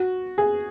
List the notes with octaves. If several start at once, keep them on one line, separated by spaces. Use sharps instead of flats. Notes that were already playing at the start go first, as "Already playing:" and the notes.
Already playing: F#4
G#4